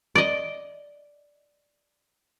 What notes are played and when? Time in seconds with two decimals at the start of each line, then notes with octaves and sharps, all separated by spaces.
0.15 D5 D#5